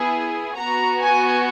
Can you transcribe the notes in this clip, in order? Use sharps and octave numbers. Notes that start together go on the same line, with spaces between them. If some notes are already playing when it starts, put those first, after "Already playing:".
Already playing: B3 E4 G#4
B3 F#4 A#5
G#5